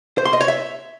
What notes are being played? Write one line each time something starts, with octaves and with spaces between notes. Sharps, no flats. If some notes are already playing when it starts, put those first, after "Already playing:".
C5
C6
D#5
C#5
E5